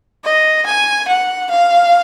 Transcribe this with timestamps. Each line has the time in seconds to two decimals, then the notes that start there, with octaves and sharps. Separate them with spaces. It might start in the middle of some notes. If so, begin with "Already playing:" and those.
0.24 D#5
0.67 G#5
1.08 F#5
1.51 F5